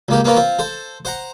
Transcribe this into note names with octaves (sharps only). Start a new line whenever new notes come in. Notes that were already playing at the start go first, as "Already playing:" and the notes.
C#2 A#3 G4
A#3 B3 C#4 F4 A#4
C4 F4
A4 C5
C5 F#5 A#5